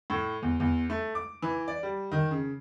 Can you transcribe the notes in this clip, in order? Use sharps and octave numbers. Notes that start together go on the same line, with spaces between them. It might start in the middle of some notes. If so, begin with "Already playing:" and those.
A2
E2
E2
A3
D6
E3
D5
G3
D#3
C#3